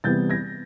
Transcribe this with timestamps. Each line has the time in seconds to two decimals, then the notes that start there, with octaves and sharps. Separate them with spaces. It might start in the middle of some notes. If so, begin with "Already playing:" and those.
0.04 C3 E3 G3 B3 G6 A6
0.30 G#6 A#6